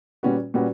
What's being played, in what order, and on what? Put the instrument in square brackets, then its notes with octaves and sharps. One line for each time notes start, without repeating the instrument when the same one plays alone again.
[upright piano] A#2 G3 C#4 F#4 B4
A#2 G3 C#4 F#4 B4